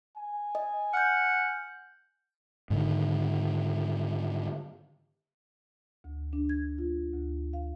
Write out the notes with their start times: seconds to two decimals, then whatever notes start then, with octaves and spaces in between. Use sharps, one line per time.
0.17 G#5
0.55 D#5
0.94 F#5 F6 G6
2.70 G#2 D3 D#3
6.04 D2
6.33 D4
6.49 G#6
6.78 F4
7.14 D2
7.53 F5